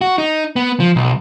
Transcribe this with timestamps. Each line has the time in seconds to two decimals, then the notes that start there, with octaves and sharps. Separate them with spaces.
0.01 F#4
0.18 D#4
0.56 B3
0.80 F3
0.96 B1